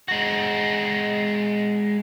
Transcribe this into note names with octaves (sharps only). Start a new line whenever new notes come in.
G#3 F#4